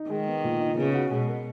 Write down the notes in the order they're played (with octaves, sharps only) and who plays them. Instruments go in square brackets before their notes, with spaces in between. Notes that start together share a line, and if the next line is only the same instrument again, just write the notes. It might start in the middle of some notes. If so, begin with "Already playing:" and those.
Already playing: [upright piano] D#4
[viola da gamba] D#3 [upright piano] G#3
[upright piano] B3
A#2
D#4
[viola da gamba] C#3 [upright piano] B3
[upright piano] F#4
[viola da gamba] B2 [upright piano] G#3
[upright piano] A#4